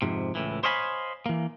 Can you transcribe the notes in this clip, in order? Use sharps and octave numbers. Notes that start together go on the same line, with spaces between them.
F2 G#2 C3
C#2 A2 E3
C5 C#5 D#5 F5 G#5 B5
E3 A#3